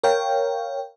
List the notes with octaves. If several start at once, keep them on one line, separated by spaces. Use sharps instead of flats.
A#4 C#5 F5 G5